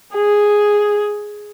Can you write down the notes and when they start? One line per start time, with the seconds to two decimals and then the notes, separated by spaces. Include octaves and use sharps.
0.15 G#4